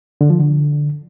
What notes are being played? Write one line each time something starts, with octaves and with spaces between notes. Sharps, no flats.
D3
F3
D3